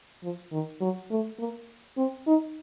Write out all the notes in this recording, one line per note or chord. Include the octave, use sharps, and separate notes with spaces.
F3
D#3
F#3
A3
A#3
C4
D#4